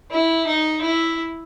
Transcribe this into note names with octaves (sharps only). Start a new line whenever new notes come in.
E4
D#4
E4